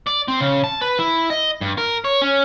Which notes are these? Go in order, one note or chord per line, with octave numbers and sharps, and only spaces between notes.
D5
C4
C#3
A5
B4
E4
D#5
G2
A#4
C#5
C#4